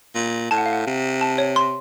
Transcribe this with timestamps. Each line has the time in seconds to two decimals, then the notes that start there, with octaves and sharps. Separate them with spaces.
0.15 A#2
0.51 A2 A5
0.58 F#5
0.66 F5
0.73 F#5
0.86 C3
1.21 A5
1.38 C#5
1.56 C6